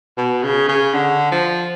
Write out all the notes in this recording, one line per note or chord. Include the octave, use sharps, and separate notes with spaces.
B2
C#3
C#3
D3
F3